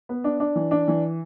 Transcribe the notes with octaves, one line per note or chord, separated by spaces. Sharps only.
B3
D4
D4
E3
D4
E3